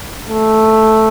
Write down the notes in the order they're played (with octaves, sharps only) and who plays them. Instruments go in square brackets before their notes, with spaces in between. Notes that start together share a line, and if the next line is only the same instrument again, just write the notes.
[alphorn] A3